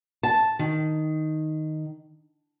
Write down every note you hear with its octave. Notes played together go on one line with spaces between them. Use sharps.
A5
D#3